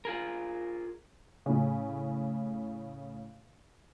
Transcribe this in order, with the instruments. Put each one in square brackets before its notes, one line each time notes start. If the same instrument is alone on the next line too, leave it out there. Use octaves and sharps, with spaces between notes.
[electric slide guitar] F4 G#4 A#4
[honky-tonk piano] A2 C#3